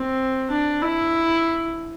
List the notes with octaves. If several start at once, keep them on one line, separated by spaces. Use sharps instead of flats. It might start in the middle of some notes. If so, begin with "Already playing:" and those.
Already playing: C4
D4
E4